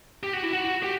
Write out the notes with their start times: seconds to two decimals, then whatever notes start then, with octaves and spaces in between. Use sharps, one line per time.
0.23 G4
0.33 F#4
0.43 E4
0.53 F#4
0.83 G4